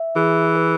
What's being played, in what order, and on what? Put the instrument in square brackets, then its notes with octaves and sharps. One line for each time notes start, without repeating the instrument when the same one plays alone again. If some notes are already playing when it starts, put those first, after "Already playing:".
Already playing: [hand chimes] E5
[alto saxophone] E3 [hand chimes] G#4
[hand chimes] B4